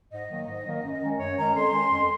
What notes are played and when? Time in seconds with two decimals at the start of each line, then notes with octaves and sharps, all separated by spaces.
0.11 G#2 D#5
0.29 D#3 F#3 A#3
0.46 G#2
0.64 D#3 F#3 A#3
0.82 F#2
1.01 D#3 G#3 C#4
1.18 F#2 C#5
1.37 D#3 G#3 C#4 A#5
1.54 F2 C6
1.72 D#3 G#3 C#4
1.90 F2